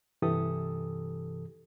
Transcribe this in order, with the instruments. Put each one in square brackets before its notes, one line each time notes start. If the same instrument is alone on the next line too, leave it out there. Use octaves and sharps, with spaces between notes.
[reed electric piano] G2 C3 E3 G4 A4 D#6